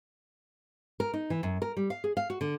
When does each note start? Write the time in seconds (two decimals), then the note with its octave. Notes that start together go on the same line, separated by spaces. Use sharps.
1.00 A#4
1.13 D#4
1.30 E3
1.43 F#2
1.62 A#4
1.77 G3
1.90 F5
2.04 G#4
2.17 F5
2.30 F#4
2.41 D3